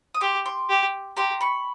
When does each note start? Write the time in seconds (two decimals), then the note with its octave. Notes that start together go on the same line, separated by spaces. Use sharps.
0.15 D#6
0.21 G4 C6 D6
0.46 C6 D6
0.69 G4
1.17 G4 A#5 C6
1.41 B5 C#6